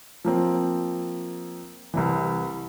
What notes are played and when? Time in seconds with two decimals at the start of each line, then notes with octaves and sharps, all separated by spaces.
0.25 F3 A#3 C4
1.94 C2 C3 E3